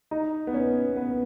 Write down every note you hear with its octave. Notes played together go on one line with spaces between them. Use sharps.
D#4
B3
C#4
B3